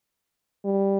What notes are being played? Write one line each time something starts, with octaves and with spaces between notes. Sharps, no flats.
G3